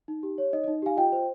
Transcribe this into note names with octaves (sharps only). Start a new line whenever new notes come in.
D#4
G4
C#5
D#4 D#5
D#5
D#4
G4 F5 G#5
F4 D#5 G5
C5